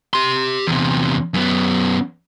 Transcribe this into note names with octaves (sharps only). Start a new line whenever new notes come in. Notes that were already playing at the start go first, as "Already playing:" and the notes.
G4 C6
E2 C3
F#2 B3